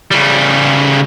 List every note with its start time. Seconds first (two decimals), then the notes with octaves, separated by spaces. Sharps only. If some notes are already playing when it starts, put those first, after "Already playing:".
0.11 C#3 G3